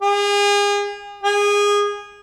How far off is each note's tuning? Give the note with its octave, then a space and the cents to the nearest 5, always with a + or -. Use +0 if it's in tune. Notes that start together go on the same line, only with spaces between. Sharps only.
G#4 -35
G#4 -20